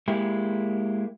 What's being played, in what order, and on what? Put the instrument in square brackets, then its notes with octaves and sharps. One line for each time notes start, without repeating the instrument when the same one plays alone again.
[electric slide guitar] G#3 A#3 E4 G4